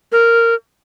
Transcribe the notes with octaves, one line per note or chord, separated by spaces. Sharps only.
A#4